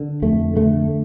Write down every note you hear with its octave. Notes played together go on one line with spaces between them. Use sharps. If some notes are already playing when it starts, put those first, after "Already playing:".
Already playing: D3
F2 A3
D3 A3